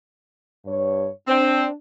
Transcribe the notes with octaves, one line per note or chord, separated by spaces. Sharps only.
G2 C#5
C4 D4